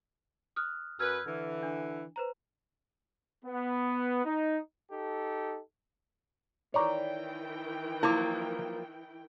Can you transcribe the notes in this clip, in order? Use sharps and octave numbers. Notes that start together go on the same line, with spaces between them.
D#6 F6 F#6
F#2 B4 E6 F6 G#6
D3 E3
D4
B4 C5 A#5
B3
D#4
D#4 G4 A4
D#3 E3 C#5 D5 G5 A#5
F3 F#3 A#3 E4 D6